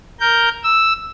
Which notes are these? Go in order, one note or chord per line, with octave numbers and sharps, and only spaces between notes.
A#4 G6
E6